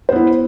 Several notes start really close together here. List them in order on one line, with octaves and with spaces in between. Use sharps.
C5 B3 E4